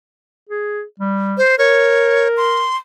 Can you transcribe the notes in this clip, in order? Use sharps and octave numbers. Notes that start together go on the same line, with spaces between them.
G#4
G3
C5
A#4 C#5
C6